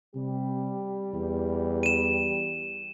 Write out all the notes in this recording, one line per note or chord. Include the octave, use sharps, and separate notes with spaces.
C3 G3 G4
E2
D#7 E7